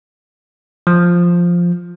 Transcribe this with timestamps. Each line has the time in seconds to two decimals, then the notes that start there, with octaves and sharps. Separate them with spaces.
0.87 F3